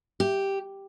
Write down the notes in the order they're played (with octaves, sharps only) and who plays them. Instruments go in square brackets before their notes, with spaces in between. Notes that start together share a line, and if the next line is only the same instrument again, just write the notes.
[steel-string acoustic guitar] G4